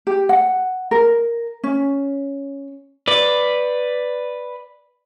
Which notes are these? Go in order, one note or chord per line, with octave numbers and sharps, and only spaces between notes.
G4
F#5
A#4
C#4
B4 D5